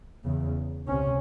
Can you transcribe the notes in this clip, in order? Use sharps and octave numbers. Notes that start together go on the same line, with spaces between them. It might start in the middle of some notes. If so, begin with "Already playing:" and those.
E2 C#3
C#2 C3 C#4